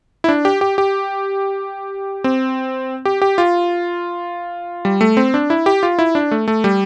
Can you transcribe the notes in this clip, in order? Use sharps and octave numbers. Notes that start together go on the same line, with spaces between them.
E4
D4
G4
G4
G4
C4
G4
G4
F4
G3
A3
C4
D4
E4
G4
F4
E4
D4
A3
A3
G3